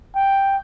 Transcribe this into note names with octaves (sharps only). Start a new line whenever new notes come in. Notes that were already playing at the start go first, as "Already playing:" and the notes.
G5